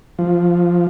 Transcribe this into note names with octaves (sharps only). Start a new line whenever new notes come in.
F3